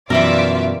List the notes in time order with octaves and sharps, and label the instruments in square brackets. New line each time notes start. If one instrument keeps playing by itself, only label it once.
[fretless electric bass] F#2 B2 [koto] E3 G3 A#4 [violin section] F4 D5 E5